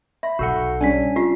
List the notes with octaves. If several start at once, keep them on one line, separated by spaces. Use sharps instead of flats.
E5 B5
B1 F#4 A4 F#5
G3 C#4 D4 G#5 B6
F4 G4 C7